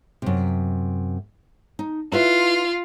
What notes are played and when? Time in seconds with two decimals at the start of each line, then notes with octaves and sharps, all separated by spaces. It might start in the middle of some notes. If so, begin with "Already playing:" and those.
0.22 F#2 C3
1.79 D#4
2.12 E4 F4 B4 E5